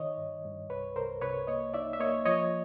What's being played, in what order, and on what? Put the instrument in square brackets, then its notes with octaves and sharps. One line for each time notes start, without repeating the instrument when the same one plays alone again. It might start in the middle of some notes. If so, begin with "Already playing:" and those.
Already playing: [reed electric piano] D#3 C#5 D#5
G2
G2
C2 B4 C#5
C2 A#4 C5
C2 B4 C#5
A#3 C#5 D#5
D#4 D5 E5
E5
A#3 C#5 D#5
F3 C#5 D#5